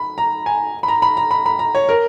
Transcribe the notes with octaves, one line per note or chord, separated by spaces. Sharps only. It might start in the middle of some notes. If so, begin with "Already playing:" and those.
Already playing: B5
A#5
G#5
B5
A#5
B5
A#5
B5
B5
A#5
C#5
A#4